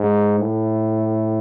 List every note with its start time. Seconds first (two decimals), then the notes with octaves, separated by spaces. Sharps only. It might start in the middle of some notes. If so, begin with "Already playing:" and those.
Already playing: G#2
0.40 A2